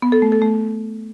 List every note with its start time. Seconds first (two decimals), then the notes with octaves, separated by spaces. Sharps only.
0.02 B3
0.12 A4
0.22 A3
0.32 A4
0.42 A3